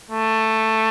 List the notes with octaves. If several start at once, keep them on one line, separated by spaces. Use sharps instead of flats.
A3